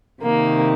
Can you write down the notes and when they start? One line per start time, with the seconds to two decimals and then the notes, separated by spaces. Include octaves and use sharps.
0.23 C3 D#3 A#3